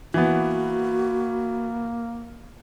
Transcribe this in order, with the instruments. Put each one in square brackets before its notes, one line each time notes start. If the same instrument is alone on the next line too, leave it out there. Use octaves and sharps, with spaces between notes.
[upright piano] E3 B3 [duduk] A#3 [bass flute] F#4